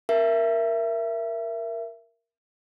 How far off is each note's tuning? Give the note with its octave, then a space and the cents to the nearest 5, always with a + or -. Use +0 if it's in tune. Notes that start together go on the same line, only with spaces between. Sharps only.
A#4 +0 E5 +20